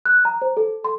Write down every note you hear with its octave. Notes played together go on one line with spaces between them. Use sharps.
F#6
A#5
C5
A4
C6